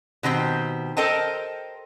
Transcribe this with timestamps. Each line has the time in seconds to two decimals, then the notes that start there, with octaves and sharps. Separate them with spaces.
0.23 B2 D#3 C4 G4
0.97 A4 A#4 C5 D#5 G5 A5